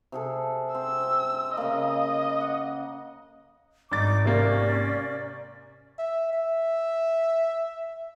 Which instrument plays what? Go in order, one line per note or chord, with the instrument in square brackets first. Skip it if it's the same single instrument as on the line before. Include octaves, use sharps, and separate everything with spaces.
[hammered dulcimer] C3 G#4 A4
[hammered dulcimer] C4 [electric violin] E6
[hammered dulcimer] C#3 A#3 [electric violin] D#5
[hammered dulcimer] F#5
[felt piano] G#1 A6 [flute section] D#4 D6
[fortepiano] C3 A#3 [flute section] C#4 D5
[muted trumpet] E5
E5